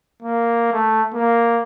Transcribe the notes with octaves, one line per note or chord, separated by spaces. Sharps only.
A#3
A3
A#3